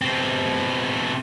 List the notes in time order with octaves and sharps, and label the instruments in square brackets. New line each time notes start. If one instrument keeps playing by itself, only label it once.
[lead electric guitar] B2 C4